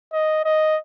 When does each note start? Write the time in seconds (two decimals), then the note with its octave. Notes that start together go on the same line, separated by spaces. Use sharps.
0.13 D#5
0.45 D#5